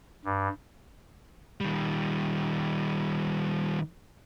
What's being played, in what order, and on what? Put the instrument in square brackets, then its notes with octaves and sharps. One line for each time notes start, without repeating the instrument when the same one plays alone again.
[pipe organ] G2
[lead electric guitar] D#3 G3